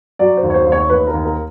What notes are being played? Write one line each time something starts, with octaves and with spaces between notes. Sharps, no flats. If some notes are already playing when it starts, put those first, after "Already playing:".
F#3 D5
C5
D#2
C#5
C5
D#2
C#5
D#2 B4
A#4
D#2
A#4